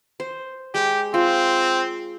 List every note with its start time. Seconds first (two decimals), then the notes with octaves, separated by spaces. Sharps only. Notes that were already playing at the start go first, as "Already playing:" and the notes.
0.20 C5
0.74 G#3 G4
1.14 C4 F4